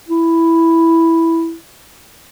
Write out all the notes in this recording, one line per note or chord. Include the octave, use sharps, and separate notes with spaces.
E4